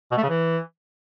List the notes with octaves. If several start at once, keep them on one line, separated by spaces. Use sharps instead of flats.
B2
A3
C#3
E3